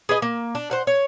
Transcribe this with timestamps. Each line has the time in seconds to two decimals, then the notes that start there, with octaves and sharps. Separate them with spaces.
0.09 G#4 B4 D#5
0.22 A#3
0.55 D4
0.71 C5 F#5
0.87 C#5